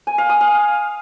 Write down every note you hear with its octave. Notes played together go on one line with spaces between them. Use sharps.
G#5
F5
D#6
F5